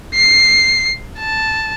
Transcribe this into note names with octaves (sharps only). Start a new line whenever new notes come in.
C7
A5